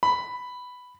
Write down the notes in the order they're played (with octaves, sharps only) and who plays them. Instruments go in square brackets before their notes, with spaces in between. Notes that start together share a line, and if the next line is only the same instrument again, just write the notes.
[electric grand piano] B5